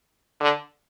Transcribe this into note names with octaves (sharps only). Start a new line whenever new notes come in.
D3